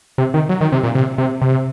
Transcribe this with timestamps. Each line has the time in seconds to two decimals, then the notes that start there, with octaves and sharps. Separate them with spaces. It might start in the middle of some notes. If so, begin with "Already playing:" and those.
0.18 C3
0.34 D#3
0.49 F#3
0.61 D#3
0.72 C3
0.83 A#2
0.95 C3
1.18 C3
1.42 C3